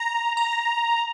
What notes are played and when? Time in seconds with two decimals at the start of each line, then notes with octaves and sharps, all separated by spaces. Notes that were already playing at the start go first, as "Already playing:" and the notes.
Already playing: A#5
0.37 A#5